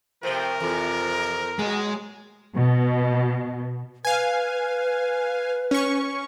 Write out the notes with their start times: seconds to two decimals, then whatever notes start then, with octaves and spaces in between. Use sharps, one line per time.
0.23 C3 F3 A3 C4 A#4
0.60 F2 C3 E3
1.59 A#2 F#3 G#3
2.55 B2
4.05 B4 F5 G#5
5.71 C#4 C#6